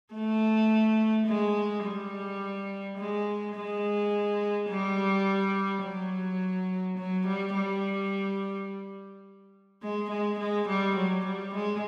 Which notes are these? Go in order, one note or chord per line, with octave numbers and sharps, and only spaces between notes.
A3
G#3
G3
G#3
G#3
G3
F#3
F#3
G3
G3
G#3
G#3
G#3
G3
F#3
G3
G#3